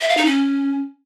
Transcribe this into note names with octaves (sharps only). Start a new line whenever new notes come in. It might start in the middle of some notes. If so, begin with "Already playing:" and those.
E5
F5
D#4
C#4